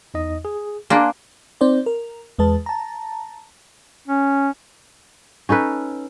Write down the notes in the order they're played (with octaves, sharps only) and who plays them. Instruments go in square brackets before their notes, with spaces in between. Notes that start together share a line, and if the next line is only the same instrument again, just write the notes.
[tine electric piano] E2 D#4 D#5
G#4
[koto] A#3 D4 [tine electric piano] G#5 C6 F#6
[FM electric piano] C4 D#4 C5 D5
A#4
E2 G#3 B4 A5
A5 A#5
[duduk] C#4
[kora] C#4 D#4 A4 B4